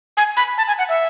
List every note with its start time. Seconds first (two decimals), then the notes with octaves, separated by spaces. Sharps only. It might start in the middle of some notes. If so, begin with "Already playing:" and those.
0.17 G#5
0.37 B5
0.58 A5
0.67 G#5
0.79 F#5
0.89 E5